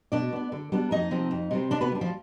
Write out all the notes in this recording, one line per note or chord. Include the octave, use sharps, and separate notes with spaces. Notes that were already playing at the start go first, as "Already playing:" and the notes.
B2 D4 D5
B3 D4
D3
G3 B3 D4
F2 D#4 D#5
C3 F3 C4
F2
C3 G3 C4
C3 D4 D5
B3 B4
G3 D4
F3 F4